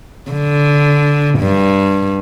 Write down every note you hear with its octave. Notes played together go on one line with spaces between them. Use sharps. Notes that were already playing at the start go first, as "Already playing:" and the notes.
D3
G2